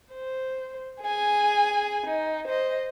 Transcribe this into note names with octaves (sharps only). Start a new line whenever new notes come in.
C5
G#4 G#5
D#4
C5 D#5